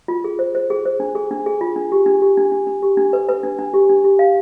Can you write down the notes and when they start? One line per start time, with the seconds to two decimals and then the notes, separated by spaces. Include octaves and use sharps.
0.08 F4
0.24 G#4
0.39 C5
0.55 C5
0.70 G#4
0.85 C5
1.00 D4
1.15 G#4
1.31 D4
1.46 G#4
1.61 F4
1.76 D4
1.92 G4
2.06 D4
2.22 G4
2.37 D4
2.52 D4
2.67 D4
2.82 G4
2.97 D4
3.13 B4
3.29 B4
3.43 D4
3.59 D4
3.74 G4
3.89 D4
4.04 G4
4.19 F5